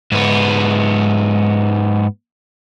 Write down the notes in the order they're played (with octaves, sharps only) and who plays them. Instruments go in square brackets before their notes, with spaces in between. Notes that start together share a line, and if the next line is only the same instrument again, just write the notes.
[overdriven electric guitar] G#2 B3